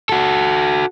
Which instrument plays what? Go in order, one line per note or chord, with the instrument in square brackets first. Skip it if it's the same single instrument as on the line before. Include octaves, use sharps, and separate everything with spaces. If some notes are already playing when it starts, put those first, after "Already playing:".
[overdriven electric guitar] F#4 A4